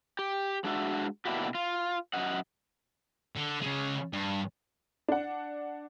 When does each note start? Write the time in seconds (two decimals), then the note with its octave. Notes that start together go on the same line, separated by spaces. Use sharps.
0.19 G4
0.64 G#3 D4 F#4 E5
1.25 B2 A#3 D4 E4 F#4 G4
1.55 F4
2.14 F#2 D#5 F#5
3.37 D3
3.62 C#3 G#3
4.13 G2
5.08 D4 F#5